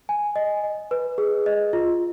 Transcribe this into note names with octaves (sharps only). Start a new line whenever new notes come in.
G#5
D#5
D#5
B4
G#4
D#5
F4